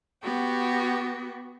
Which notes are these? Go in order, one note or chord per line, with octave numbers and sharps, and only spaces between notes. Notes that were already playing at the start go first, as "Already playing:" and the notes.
B3 F#4 G4